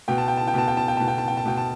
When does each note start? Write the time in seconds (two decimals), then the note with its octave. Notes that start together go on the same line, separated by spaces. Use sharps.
0.08 B2 G5
0.18 A5
0.28 G5
0.37 A5
0.47 G5
0.54 B2 A5
0.68 G5
0.77 A5
0.88 G5
0.97 B2 A5
1.08 G5
1.18 A5
1.28 G5
1.37 A5
1.46 B2 G5
1.57 A5